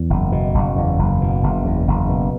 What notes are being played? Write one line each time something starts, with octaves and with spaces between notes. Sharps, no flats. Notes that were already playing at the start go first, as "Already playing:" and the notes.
Already playing: E2
F#1
B2
F#1
E2
F#1
B2
F#1
E2
F#1
B2